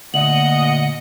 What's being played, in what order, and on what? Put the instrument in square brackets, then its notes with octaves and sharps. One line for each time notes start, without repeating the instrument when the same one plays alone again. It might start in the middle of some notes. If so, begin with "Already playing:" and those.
[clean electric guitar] D2 [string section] A#2 D#5 C#7 [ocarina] F#5 [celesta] F#7